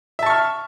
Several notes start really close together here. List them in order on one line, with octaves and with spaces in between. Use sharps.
E5 A5 C#6 F6